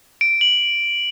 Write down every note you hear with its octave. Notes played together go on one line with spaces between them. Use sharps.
D7
F#7